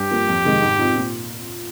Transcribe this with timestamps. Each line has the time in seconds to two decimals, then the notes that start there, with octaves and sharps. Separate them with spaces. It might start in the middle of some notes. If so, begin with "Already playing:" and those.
Already playing: G2 G4
0.11 F3 A#3
0.28 F2
0.45 C3 D#3 G#3
0.62 G#2
0.78 F3 C4 D#4
0.96 A#2